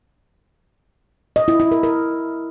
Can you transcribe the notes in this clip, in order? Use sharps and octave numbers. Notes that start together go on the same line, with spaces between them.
D#5
E4
E4
A#4
A#4